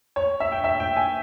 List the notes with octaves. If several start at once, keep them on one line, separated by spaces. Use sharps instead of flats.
C#5
E5
G5
E5
G5
G#5